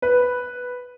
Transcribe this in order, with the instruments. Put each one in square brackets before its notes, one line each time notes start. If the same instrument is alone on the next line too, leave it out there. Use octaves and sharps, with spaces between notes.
[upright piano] B4